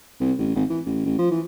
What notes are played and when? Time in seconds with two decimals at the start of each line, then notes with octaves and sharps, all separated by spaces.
0.20 C2
0.38 A1
0.55 G#1
0.70 E3
0.86 A1
1.05 A1
1.18 F3
1.31 E3